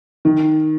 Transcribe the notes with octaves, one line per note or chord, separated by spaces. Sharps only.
D#3